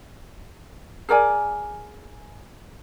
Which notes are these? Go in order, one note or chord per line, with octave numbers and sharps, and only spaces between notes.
G#4 A#4 D5 G#5